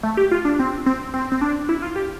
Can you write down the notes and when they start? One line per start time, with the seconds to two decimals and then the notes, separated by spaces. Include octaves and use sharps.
0.03 A3
0.17 G4
0.31 F4
0.45 D4
0.59 C4
0.86 C4
1.14 C4
1.32 C4
1.41 D4
1.69 E4
1.82 F4
1.96 G4